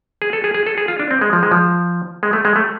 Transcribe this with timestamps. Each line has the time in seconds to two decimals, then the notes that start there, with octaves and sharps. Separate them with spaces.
0.22 G#4
0.33 A4
0.44 G#4
0.54 G#4
0.67 A4
0.77 G#4
0.88 F4
1.00 D4
1.11 C4
1.21 G#3
1.33 F3
1.43 G#3
1.51 F3
2.23 G#3
2.33 A3
2.45 G#3
2.56 A3